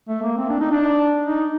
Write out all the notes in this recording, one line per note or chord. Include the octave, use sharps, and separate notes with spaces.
A3
A#3
C4
D4
D#4
D4
D#4